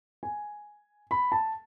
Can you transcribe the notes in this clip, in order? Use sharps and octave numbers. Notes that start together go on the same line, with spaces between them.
G#5
B5
A5